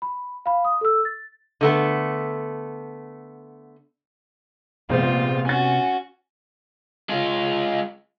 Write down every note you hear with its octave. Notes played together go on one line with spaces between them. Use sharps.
B5
F5 B5
D#6
A4 E6
A6
D3 A3 B3
A#1 C3 G#3 B3 F4 C5
C#4 F#4 G#5 A6
G#3 F4